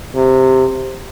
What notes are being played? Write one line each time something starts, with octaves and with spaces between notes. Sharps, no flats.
C3